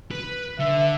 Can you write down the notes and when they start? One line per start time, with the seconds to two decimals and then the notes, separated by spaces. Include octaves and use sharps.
0.11 B4
0.59 D3 E5